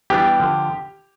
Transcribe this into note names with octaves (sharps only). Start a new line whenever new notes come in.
E3 G3 B3 D4 G4
D3 F3